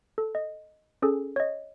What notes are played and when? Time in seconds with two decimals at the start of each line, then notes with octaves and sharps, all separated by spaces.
0.18 A4
0.35 D#5
1.02 C#4 G#4 A4
1.36 C#5 D#5